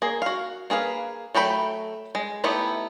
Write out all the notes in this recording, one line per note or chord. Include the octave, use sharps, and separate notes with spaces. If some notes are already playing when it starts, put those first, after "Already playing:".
A#3 G#4
F#4 F5
A#3 G#4 B4 F5
F#3 A3 G5 B5
G#3
A3 B3 D#4 E4 G4